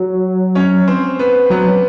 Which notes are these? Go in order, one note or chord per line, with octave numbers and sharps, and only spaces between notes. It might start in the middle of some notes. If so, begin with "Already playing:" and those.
Already playing: F#3
C#4 C#5
C4 C5
B3 B4
F#3 B3 B4